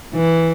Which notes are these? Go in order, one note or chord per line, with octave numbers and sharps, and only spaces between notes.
E3